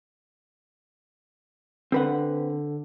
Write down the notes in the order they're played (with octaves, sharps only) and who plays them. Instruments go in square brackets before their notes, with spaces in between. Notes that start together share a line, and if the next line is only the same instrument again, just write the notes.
[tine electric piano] D3 [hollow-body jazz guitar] C4 B4 F#5